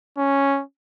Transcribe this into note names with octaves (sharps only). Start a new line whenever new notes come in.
C#4